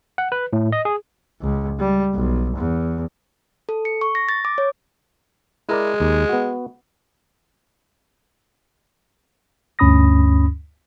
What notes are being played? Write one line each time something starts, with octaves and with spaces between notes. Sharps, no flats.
F#5
B4
A2
D#5
G#4
C#2
G3
B1
E2
A4
C#7
C#6
A#6
A6
D6
C#5
G#3 E4 A#4 D5
D#2
B3 F#4
D2 G2 C#4 B5 D#6 A#6